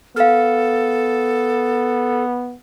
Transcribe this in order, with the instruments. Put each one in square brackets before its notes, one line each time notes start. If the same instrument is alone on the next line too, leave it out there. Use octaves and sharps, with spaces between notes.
[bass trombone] B3 [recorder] A4 [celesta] F5 F6